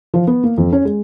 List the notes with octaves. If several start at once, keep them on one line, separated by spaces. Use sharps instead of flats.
F3
B3
A#3
F2
C#4
G#3